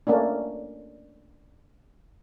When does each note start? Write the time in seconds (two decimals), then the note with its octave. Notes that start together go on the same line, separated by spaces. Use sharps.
0.07 A3 A#3 C#4 D4